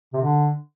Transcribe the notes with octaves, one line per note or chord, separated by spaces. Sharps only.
C3
D3